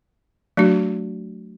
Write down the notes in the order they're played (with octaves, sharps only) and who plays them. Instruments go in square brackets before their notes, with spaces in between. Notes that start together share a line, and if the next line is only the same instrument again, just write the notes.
[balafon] F#3 A3 D4 F#4